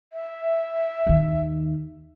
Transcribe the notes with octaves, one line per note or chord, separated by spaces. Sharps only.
E5
D#2 D#3